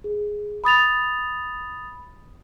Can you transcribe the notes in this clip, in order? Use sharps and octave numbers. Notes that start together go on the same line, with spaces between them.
G#4
B5 D#6 A6 F7